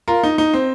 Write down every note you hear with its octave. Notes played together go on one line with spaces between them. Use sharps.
F4 A#4
D#4
D#4
C4